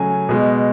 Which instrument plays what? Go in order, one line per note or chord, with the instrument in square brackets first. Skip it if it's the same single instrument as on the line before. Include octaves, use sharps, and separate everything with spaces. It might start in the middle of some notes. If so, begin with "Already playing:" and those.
Already playing: [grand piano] C#3 F#3 A3 G#5
B2 G#3